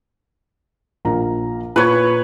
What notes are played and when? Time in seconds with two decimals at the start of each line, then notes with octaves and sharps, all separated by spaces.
1.05 A#1 A#4 A#5
1.76 A#2 B4 C#5